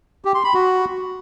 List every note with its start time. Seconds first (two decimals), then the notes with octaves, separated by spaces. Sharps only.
0.25 G4
0.35 C6
0.44 B5
0.54 F#4